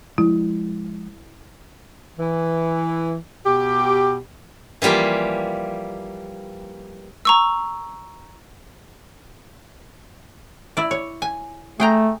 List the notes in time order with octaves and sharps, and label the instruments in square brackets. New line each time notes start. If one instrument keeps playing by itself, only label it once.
[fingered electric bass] F3 G#3 [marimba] E4
[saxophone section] E3
B2 G4
[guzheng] E3 F3 G3 A#3 F4
[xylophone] A#5 C#6 E6
[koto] E4 D5
C#5
G#5
[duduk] A3 [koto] G#4 G5 A#5